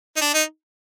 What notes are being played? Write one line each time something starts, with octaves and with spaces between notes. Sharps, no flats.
D#4
D4
D#4